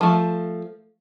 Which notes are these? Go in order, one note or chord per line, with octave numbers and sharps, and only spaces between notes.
F3 A3